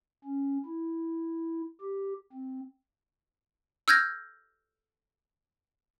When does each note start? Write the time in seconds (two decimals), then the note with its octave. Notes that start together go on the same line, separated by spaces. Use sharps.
0.24 C#4
0.65 E4
1.81 G4
2.33 C4
3.88 E6 F6 G6 G#6 A#6